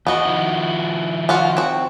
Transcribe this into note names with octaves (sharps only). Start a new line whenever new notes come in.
E2 B3 F#4 D#5
D#3 F3 E4
F4 F#4
C4 F#4